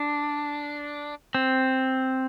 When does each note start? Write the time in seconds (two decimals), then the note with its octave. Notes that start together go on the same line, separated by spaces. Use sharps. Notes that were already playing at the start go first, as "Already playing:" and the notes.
Already playing: D4
1.35 C4